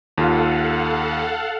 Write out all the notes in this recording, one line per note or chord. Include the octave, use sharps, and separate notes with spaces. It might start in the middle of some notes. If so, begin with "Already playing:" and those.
D#2 F4 A4 F5 F#5